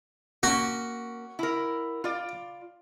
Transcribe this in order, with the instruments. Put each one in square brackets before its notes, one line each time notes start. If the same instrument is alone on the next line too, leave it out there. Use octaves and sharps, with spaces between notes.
[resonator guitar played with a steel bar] A#3 C#4 [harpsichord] F#4
[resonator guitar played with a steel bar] E4 A#4
F4 D5